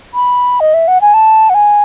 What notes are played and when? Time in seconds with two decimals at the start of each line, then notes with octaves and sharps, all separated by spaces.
0.14 B5
0.60 D#5
0.74 E5
0.88 F#5
1.01 G#5
1.14 A5
1.50 F#5
1.54 G#5